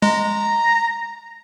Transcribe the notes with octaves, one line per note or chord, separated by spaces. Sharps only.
G#3 A#5